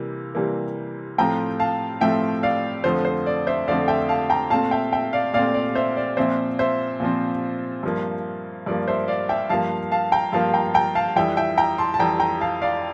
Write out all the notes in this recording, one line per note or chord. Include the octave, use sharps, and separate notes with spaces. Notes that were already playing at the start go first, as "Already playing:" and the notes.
Already playing: C3 E3 G3 A#3
C3 E3 G3 A#3
A2 F3 A3 C4 G5 A#5
F5 A5
A2 F3 A3 C4 E5 G5
D5 F5
F2 D3 F3 A3 C4 C5
C5
D5
C5 E5
F2 D3 F3 A3 C4 D5 F5
E5 G5
F5 A5
G5 A#5
A#2 A3 C4 F5 A5
E5 G5
E5 G5
D5 F5
A#2 A3 C4 D5 F5
D5
C5 E5
D5
A#2 F3 C4 C5 E5
C5 E5
A#2 F3 C4
G2 F3 A#3
G2 F3 A#3 D5
C5 E5
D5 F5
E5 G5
G2 F3 A#3 F5 A5
F5 A5
G5 A#5
G2 F3 A#3 F5 A5
G5 A#5
G5 A#5
F5 A5
F2 E3 G3 E5 G5
E5 G5
G5 A#5
A5 C6
A5
F2 E3 G3 G5 A#5
G5 A#5
F5 A5
D5 F5